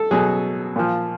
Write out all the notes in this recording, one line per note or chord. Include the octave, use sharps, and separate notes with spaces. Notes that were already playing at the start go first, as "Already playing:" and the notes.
Already playing: A4
B2 F#3 G#4
A#2 F3